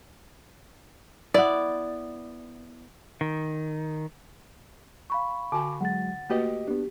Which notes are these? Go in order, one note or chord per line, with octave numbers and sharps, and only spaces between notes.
B3 E4 D5
D#3
F5 B5 C#6
D3 F#4 G#5 D6
F#3 G#3 F#5 A6
A3 A#3 F#4 G4 B4 D#5
B3 D4 G4